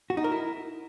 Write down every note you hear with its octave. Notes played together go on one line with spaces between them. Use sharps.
F#4
D#4
A#4
E4